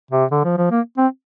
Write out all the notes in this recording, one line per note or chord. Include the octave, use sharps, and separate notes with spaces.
C3
D3
F3
F3
A#3
C4